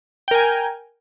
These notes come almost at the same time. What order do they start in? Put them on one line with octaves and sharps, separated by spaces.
G5 A#4 G#5